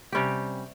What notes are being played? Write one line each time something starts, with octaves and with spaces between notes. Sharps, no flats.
C3 G3 C#4 G4